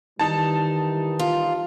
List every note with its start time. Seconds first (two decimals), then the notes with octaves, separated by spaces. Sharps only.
0.19 D#3 E3 G3 D#4 A5
1.19 F4